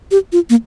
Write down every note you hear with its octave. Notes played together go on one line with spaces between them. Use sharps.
G4
F4
A#3